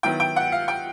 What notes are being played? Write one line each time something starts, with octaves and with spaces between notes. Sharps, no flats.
D#3 F#3 B3 E4 G5
G5
F#5
F5
G5